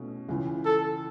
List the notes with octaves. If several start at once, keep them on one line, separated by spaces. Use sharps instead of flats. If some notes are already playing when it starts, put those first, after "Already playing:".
Already playing: B2 A3 C#4 E4
C#2 C#3 E3
A4